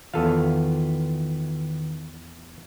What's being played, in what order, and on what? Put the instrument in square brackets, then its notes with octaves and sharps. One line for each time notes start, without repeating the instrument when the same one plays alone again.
[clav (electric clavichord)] E2 A4 F5 [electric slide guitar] D#3 F4 B4